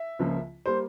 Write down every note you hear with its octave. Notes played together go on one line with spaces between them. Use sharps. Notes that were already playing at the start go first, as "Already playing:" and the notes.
Already playing: E5
C#2 C#3 F3 A#3
G3 A#3 C5